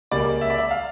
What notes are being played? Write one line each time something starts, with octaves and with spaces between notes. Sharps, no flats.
C#2 C#3 G3 A#3 D5
E5
D5
E5
F5